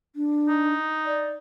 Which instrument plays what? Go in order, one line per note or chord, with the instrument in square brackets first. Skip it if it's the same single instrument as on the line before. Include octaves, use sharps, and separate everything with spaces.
[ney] D4
[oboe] D#4
[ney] D5